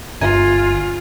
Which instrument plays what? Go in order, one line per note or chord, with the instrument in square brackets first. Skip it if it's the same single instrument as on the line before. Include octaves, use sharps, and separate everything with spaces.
[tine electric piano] G1 G#5 [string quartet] F4